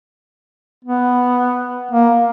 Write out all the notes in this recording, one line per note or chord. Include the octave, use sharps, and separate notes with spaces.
B3
A#3